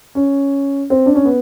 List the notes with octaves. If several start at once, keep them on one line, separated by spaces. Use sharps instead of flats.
C#4
C4
D4
C#4
B3